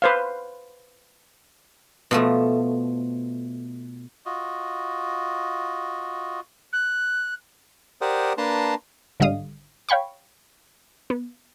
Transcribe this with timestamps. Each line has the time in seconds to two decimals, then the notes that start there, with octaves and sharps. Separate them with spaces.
0.02 B4 C5 F5
2.11 B2 F3 A3
4.26 F4 F#4 D#5
6.73 F#6
8.01 G4 A#4 C5 D5 F#5 D#6
8.38 A#3 D4 B4 A5 A#5 C6
9.20 G#1 D3 G3 D#5 F5 D#6
9.89 C#5 F5 G5 B5 C#6
11.10 B3